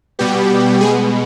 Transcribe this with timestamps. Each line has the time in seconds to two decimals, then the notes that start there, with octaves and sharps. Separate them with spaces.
0.19 B2 G3 B3 G4
0.80 B2 G#3 B3 G#4